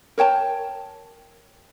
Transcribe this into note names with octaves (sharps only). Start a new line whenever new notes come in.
A#4 C#5 G5 A5